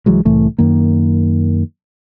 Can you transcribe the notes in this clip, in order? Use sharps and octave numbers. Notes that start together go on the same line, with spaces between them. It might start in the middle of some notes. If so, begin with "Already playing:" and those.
C2 E3 F#3 G#3
C2 A2 E3 A3
F#2 D#3 A#3